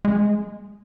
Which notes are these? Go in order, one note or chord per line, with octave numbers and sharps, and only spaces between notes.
G#3